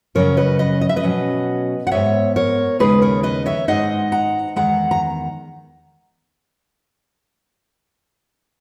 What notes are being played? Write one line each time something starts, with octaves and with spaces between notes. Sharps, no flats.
F#2 C#3 F#3 C#4 A#4 C#5
B4 D#5
B4 D#5
D#5
E5
B4 D#5
B2 F#3 C#4
F#5
G#2 E3 B3 C#5 E5
A#4 C#5
D#2 C#3 G#3 D#4 G#4 B4
A#4 C#5
B4 D#5
C#5 E5
G#2 E3 G#3 D#4 D#5 F#5
F#5 A#5
E2 D#3 G#3 F#5 A#5
A#5